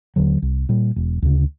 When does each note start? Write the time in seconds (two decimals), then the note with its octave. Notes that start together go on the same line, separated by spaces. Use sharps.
0.16 D#2 D3 F#3
0.42 C2
0.69 A#2 G3
0.96 E1
1.22 D2 C#3